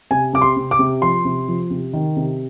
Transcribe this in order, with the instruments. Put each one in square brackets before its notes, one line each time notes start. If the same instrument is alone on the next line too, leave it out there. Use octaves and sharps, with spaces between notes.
[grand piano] C3 G#5
C3 D6
C6
C3
D6
C3
F3 C6
C3
F3
C3
D#3
C3